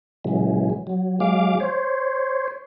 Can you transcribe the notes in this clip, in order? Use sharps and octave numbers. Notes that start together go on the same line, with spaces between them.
A#2 C#3 E3 F#3 G#3
F#3
F#3 G#3 F5 D6
C5 C#5